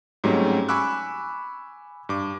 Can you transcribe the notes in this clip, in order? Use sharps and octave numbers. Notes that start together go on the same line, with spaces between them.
G#2 F#3 G3 A3 C4 C#4
G#5 B5 C#6 D6 E6 F#6
G2 D6